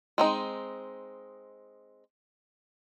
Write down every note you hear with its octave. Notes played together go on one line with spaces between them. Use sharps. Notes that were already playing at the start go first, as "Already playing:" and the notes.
G#3 C4 D#4